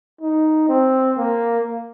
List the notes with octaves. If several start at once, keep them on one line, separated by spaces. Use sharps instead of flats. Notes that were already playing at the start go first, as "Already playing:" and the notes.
D#4
C4
A#3